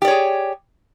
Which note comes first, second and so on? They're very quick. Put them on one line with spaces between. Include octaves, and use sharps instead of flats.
G4 D5 C#5 G#4